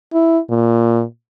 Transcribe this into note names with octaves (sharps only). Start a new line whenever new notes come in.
E4
A#2